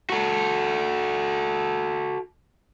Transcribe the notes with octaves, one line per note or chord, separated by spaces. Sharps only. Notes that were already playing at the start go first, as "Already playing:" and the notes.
F#4 A4